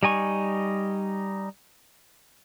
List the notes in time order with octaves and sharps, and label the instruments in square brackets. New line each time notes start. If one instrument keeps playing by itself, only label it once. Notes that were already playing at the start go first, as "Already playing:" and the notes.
[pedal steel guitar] G3 D#4 G#5 C#6